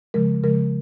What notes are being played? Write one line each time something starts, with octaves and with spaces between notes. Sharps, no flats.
C#3 F3 G#3 A#4
C#3 F3 G#3 A#4